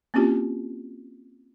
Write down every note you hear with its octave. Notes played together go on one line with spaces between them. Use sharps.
A#3 C4 C#4 E4 F4 G4